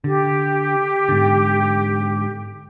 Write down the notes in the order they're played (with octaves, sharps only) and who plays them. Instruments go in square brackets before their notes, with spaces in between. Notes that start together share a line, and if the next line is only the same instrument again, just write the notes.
[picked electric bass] D3 [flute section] G4
[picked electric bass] G#2 D3